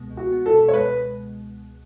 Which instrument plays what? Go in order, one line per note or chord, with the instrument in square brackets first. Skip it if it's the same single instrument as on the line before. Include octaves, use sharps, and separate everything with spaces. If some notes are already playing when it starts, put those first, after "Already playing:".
Already playing: [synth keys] C#2 B2 G#3 B3
C#2
[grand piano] F#4
[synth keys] B3
[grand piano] A4
[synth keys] B2
[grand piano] C#5
[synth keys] G#3 [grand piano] B4